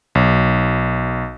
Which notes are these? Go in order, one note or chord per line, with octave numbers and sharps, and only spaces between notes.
B1